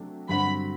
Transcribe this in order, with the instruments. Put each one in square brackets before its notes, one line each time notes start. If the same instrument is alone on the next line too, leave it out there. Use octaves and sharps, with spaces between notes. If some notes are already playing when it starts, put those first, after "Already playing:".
Already playing: [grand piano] C3 F#3 A3 D4
[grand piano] G2 D3 F#3 C4 F#4 [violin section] B5